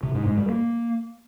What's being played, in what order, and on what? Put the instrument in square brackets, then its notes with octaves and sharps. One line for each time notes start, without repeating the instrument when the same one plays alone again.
[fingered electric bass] C3
G#2
G#2
G3
A#3